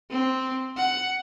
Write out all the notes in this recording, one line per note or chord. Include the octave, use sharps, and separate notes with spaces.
C4
F#5